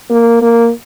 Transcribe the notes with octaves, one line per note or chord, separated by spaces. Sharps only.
A#3
A#3